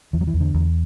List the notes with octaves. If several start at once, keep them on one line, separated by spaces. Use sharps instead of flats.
E2 E3
F#3
E3
E2
D3
E2